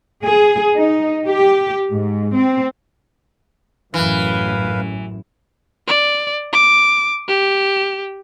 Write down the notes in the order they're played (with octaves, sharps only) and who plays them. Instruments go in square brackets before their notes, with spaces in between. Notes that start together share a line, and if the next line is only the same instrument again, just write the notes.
[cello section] G#4
D#4
G4
G#2
C4
[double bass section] A1 F#2 [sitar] E3 [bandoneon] B4 F5
[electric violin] D5
D6
G4